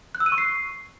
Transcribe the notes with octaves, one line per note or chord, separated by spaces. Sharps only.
F#6
E6
D#7
C#6
C7